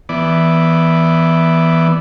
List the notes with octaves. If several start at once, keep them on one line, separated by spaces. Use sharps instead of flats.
E3 B3 D5